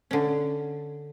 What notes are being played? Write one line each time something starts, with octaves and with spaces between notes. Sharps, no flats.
D3 C#4